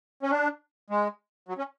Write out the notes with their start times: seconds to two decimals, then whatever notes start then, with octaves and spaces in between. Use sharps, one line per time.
0.23 C#4
0.31 D4
0.90 G#3
1.48 F#3
1.58 C#4